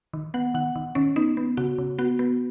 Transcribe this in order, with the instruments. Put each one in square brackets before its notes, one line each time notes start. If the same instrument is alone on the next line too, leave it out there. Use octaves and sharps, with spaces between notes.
[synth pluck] D#3
B3 F#5
D#3 F#5
D#3
D#3 C#4
B3 D#4
B3
C#3 F#4
C#3
B3 F#4
B3